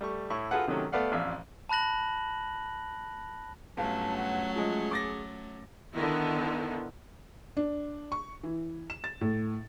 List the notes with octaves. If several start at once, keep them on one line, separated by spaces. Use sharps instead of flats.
G3 A3 C#6
A2 E4 C#6
F4 F#4 G#4 A4 B4 F#5
C3 D#3 F#3 A3 C#4
A3 B3 D5 F5 F#5
A1 F2 D5 E5 F5
A5 B5 F#6 A#6 F#7
G1 F#3 A3 C#4 F5 A5
F#5
F3 G#3 G#4
D6 A6 A#6
D3 D#3 B3 E4
D4
C#6
E3
E7
A6
A2